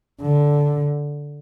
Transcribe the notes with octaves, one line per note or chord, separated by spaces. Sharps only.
D3